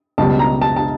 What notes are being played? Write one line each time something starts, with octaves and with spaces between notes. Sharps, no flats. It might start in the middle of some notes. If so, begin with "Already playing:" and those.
C#2 B2 G3 A5
A#5
A5
A5